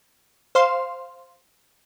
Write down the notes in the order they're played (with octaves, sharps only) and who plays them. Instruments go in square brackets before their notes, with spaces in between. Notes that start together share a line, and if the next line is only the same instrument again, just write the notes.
[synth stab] C5 F5 C6